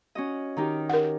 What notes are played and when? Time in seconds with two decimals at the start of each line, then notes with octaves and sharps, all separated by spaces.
0.15 C#4 F#4 D#5
0.57 D#3 D#4 G4
0.89 A#4 F#5